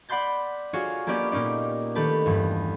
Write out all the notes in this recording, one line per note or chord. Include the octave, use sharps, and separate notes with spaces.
D5 F#5 B5 C6 G6 A6
F4 F#4 G#4 C#5
A#3 B3 C#4 G4 D5
A#2 A#3 C#4 D#4 D5
D#3 A3 G4 A4 B4
E2 G2